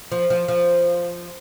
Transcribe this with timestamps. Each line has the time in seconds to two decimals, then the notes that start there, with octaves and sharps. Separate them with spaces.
0.12 F3
0.30 F3
0.48 F3